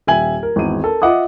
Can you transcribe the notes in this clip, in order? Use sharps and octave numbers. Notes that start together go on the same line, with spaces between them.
D#1 E5 G5 G#5 G#6 F#7
A#4
G#1 E2 D#7
A4 A#4
F4 D#5 E5 F#5 D6 D#6